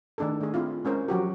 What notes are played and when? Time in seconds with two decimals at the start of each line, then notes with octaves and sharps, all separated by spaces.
0.18 D#3 A3 D4 G#4 A4
0.41 A3 G#4
0.54 C4 E4 F4
0.85 G#3 C#4 A#4 C5
1.08 F3 F#3 F#4 G4